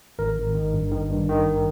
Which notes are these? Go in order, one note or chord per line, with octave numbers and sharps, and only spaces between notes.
G#1 A#4
G#1
D#3
G2
D#3
G2
D#3